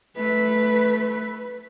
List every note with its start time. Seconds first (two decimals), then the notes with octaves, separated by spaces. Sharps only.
0.17 A3 B4